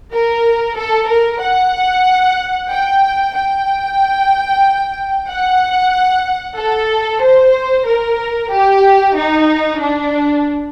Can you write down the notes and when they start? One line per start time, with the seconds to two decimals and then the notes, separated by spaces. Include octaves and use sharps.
0.12 A#4
0.76 A4
1.08 A#4
1.41 F#5
2.70 G5
3.35 G5
5.28 F#5
6.58 A4
7.22 C5
7.87 A#4
8.52 G4
9.16 D#4
9.80 D4